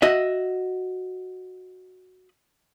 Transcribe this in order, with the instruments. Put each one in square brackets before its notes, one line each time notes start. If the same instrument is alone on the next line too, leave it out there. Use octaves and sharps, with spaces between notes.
[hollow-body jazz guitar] F#4 D#5 E5